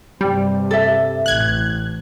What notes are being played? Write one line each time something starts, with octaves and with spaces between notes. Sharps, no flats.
G2 C3 G3
A4 E5
A1 F#6 G#6